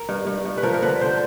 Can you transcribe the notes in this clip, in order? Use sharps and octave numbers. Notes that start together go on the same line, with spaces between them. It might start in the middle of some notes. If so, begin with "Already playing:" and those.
Already playing: A#4
G2
G2
G2
B4
F3 A#4
A#4
D3 B4
D3 C5